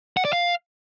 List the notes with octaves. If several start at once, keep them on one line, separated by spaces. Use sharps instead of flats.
F#5
D5
F5